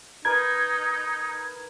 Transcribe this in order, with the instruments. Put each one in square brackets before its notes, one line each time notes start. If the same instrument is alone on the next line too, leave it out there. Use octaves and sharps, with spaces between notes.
[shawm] D#4 [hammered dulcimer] A#4 B4 [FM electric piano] G#6